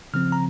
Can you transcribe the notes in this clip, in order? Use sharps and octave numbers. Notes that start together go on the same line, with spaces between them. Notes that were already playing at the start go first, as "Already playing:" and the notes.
C#3 F3 C4 F6
A#5